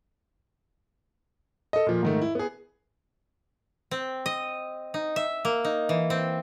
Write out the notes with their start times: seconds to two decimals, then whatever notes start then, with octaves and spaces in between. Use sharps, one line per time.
1.73 A4 D#5
1.86 A#2 F3
2.03 G#2 D#3 A3
2.22 E4
2.35 B3 G#4
3.91 C4
4.26 D#5
4.94 D#4
5.16 E5
5.45 A#3
5.65 D#4
5.89 E3
6.10 C4